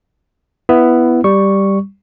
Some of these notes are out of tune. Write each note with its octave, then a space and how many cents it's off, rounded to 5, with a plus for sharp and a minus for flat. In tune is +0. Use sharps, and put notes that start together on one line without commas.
B3 +0 E4 +10
G3 +0 C#6 +0